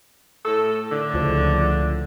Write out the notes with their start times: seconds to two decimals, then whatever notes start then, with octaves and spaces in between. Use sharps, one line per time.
0.45 A2 A4
0.91 A2 D3
1.14 C#2 F3